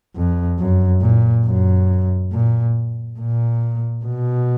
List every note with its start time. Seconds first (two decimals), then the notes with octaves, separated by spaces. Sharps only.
0.15 F2
0.59 F#2
1.01 A#2
1.45 F#2
2.32 A#2
3.19 A#2
4.05 B2